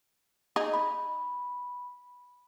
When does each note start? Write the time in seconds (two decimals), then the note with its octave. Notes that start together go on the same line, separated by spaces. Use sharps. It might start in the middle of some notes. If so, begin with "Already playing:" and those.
0.56 D#4 G#4
0.74 B5